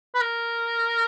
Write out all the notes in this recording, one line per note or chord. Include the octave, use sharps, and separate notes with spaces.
B4
A#4